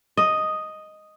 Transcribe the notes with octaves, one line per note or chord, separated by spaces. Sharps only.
D#5